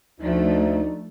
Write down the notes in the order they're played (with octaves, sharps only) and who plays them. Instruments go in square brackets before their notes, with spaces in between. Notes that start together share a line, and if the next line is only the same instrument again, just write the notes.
[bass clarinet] D2 [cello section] F3 A3 [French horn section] D4 D#4